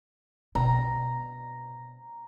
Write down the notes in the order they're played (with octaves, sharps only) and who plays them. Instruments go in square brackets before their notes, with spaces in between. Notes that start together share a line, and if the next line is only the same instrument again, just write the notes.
[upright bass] B2 [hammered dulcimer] A#5